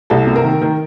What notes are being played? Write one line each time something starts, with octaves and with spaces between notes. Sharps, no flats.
C2 A4
C3
A#4
D#3
D#3 A#4